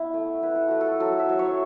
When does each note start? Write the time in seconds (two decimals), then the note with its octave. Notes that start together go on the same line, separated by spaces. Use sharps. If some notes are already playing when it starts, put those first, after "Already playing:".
Already playing: B3 E4
0.14 A3
0.43 E4 B4
0.55 A4
0.68 A3 F#4
0.81 A4
1.00 F#3 A4
1.19 E5
1.29 F#3
1.39 C#5